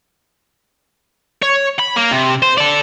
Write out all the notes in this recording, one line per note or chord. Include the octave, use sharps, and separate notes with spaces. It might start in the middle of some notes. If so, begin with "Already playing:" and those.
C#5
B5
A#3
C3
C5
A4 D5